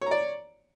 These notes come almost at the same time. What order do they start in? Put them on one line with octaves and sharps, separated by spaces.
C#5 A#5 D5